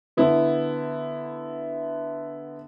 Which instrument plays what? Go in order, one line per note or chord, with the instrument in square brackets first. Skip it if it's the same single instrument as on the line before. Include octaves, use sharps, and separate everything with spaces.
[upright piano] D3 B3 E4